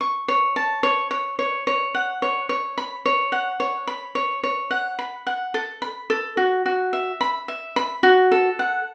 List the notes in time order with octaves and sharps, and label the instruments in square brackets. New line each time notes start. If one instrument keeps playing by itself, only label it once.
[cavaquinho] C#6
C#5
A5
C#5
C#5
C#5
C#5
F#5
C#5
C#5
B5
C#5
F#5
C#5
B5
C#5
C#5
F#5
B5
F#5
A4
B5
A4
F#4
F#4
E5
B5
E5
B5
F#4
A4
F#5